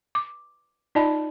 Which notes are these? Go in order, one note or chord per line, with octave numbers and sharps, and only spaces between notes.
D6
D#4 F4 D5 D#5 A5 B5